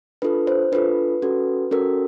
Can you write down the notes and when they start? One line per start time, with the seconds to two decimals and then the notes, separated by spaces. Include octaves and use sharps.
0.22 D4 F4 A4 B4
0.47 C5
0.72 D4 F4 A4 B4
1.22 C#4 F#4 A4
1.71 C#4 F#4 A4 A#4